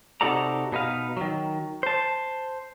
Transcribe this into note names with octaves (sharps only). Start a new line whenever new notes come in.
C3 D#4 F#4 A4 D5 A#5
B2 D#4 B4 F5
D#3 F#3
C5 A5